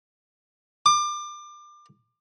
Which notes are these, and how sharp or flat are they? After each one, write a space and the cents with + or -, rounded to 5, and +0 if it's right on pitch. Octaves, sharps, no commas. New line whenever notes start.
D6 +30